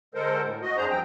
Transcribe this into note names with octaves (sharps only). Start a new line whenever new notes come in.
D3 G#3 A4 A#4 C5
A2
F#4 D#5
F#2 D4 G#4 C5 A#5
G2 F3 C4 G5